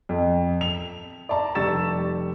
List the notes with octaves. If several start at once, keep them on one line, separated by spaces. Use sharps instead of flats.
F2
F7
D5 A5 A#5
F1 G3 C#6 E6 A6 E7